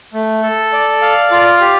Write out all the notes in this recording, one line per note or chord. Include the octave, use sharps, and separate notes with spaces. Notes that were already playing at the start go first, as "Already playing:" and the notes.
A3
A4
D5
F5
F4
G4